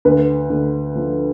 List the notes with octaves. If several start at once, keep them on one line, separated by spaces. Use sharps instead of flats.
D2 B4
D2
F3